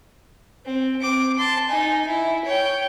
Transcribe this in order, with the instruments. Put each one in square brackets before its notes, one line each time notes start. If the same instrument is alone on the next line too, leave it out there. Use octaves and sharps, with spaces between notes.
[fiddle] C4
C4 D6
A5 C6
D#4 G#5
E4
C#5 G5